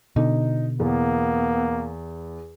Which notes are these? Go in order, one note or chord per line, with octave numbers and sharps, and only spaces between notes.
B2 D3 D#4
E2 A#3 B3